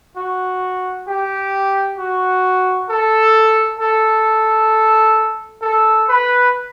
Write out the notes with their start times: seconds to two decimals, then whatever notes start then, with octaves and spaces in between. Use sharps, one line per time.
0.16 F#4
1.07 G4
1.98 F#4
2.89 A4
3.80 A4
5.62 A4
6.08 B4